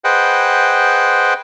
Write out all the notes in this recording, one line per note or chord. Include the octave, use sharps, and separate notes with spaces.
G#4 B4 C5 D#5 F#5 G5